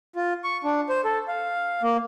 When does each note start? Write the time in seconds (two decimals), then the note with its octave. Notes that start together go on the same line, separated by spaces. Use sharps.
0.16 F4
0.44 C#6
0.64 D4
0.89 C5
1.04 A4
1.28 F5
1.83 A#3